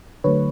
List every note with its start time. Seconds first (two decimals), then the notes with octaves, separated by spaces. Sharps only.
0.24 D3 F#3 A3 B4 C#5